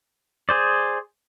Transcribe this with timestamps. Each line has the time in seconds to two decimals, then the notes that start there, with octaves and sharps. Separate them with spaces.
0.49 G#4 C5 D5